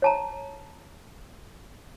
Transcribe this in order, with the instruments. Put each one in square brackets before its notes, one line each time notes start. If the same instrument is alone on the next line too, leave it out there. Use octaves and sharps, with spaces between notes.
[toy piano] C#5 A5 A#5